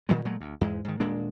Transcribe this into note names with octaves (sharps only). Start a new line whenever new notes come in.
A#2 D#3 F#3 G#3
A#2 F#3 G#3 A3
D2
E2 G#2 G#3
G#2 D#3
D#1 A#2 G#3 D4